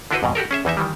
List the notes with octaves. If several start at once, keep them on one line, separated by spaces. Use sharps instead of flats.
D3 D4 E4 F#4 B4 C5
F2 G#2 B2
F#4 G4 A4 A#4
C#4 G#4 E5
E2 E3 D#4 E5
D#3 E3 G3